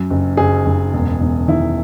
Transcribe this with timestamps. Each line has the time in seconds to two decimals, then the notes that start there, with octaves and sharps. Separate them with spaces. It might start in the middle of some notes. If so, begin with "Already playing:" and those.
Already playing: F#2
0.10 F#1
0.37 F#1 G#4
0.66 F#1
0.94 E1
1.20 E1
1.48 D#3 E4